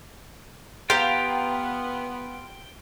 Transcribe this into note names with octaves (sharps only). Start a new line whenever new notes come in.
B3 F4 G4 F5 G5 A#5